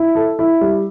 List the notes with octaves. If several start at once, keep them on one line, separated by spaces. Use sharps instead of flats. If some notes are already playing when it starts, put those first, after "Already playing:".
Already playing: E4
A4
E4
G3